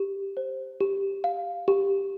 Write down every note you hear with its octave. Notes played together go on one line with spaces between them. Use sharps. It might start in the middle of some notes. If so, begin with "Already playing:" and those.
Already playing: G4
C5
G4
F5
G4